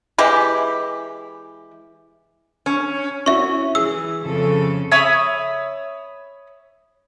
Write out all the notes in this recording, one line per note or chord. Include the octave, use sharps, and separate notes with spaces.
E3 G#3 E4 G4
C#4
C#4 E4 F#4 E5 C#6
E3 G#4 E6
F2 C#3 A4
C#5 E5 B5 D#6